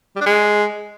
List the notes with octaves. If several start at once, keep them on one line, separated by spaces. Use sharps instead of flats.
G3
D4
G#3